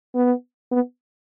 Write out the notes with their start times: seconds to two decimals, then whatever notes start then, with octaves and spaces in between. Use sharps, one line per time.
0.15 B3
0.72 B3